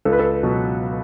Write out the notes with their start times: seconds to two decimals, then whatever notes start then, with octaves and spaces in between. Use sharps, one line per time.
0.05 C#2 A4
0.12 B4
0.19 A4
0.43 B2 F#3